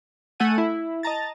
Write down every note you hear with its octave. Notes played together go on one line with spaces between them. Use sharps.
A3 A4 F#5 G#5 D#7
E4
D#5 A5 A#5 A6